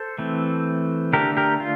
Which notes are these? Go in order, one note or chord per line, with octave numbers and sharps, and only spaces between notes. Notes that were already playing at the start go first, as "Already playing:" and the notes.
Already playing: A4 C5
E3 A3 C4
D3 A3 D4 G4 A#4
G4 A#4
F4